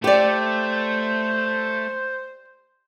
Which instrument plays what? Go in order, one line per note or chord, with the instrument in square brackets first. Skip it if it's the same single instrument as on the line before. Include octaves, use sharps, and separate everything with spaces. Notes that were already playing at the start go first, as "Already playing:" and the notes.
[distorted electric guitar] A3 [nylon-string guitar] G4 D5 [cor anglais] C5